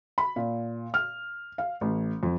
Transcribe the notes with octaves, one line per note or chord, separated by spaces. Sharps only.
B5
A#2
F6
F5
A1
F2